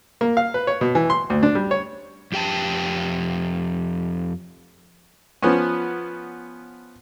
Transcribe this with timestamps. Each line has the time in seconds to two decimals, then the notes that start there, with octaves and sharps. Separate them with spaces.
0.21 A#3
0.37 F5
0.54 B4
0.67 C#5
0.81 B2
0.95 E3
1.10 C6
1.30 D2
1.43 D4
1.55 G3
1.71 C#5
2.32 F2 G4 G5 A5
5.42 F3 B3 C#4